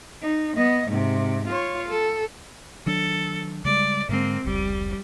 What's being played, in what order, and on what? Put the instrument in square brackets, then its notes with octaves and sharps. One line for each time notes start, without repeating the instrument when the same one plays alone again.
[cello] D#4
B3 D#5
G#2 C3
F4 C#5
A4
[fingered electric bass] D#3 F#3 D4 [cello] A4
[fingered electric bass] C#3 G3 G#3 [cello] D5
[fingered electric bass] G#2 D3 G#3 [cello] A#3 C4
[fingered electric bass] F1 C#2 [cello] G3